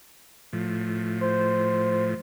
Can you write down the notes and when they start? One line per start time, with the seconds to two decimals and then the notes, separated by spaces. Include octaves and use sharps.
0.53 A2 F3
1.21 C5